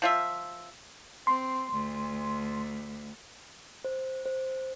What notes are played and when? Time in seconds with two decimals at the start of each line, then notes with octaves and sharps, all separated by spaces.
0.02 F3 F4 E5
1.27 C4 C6
1.72 D2
3.85 C5
4.26 C5